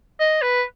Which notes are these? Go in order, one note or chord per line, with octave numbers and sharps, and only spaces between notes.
D#5
B4